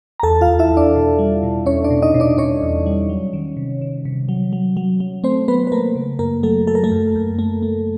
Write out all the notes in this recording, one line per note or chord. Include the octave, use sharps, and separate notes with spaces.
A#5
E2 A4 A5
F4 F5
E2
E4 E5
E2
D4 D5
B2
G3
B2
E2 C#4 C#5
D4 D5
B2
D#4 D#5
B2
D4 D5
B2 C#4 C#5
E2
G3
F#3
D#3
C3
D#3
C3
F#3
F#3
F#3
F#3
A3 C4 C5
F#3 B3 B4
B4
A3 A#3 A#4
C#3
F#2 A#3 A#4
F#3 A3 A4
F#3 A4
A#4
A3 A4
F#2
F#2
A3
A3